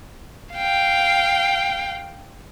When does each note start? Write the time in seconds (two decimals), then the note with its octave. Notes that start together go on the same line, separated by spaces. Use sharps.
0.54 F5 G5